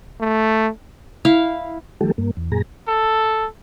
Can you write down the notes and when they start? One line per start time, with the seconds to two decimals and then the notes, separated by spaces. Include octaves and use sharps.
0.20 A3
1.25 E4 F5
2.01 D#3 F3 G3 A3 G4 A4
2.18 G2 A#3
2.37 E2
2.52 F#2 A#2 G#4 A#5
2.88 A4